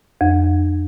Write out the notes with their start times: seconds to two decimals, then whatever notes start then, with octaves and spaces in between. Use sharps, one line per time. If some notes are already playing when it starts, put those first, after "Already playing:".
0.21 F2